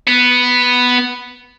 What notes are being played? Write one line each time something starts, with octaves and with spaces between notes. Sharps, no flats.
B3